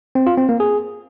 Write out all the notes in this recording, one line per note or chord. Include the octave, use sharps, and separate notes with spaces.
C4
F4
C4
A#3
G#4